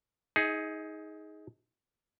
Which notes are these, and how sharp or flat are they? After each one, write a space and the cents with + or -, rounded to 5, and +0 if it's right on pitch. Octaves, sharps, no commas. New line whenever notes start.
D#4 +25 G#4 +0 E5 -15